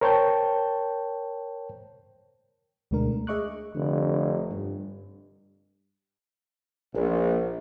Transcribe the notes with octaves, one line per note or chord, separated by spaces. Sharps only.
A#4 C5 C#5 G5 A5 G6
D2 B2 G#3 A3 D4 A#4
A3
G#4 D#5 E5 C#6 D6 F#6
F1 D3
G2
A#1